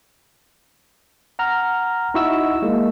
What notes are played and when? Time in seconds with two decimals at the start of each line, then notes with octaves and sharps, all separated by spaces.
1.39 F#5 A#5 F6
2.14 D#4 E4 F#4 D#5 E5 E6
2.62 G#3 A#3